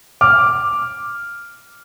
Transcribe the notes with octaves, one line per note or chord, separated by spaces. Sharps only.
D6 F6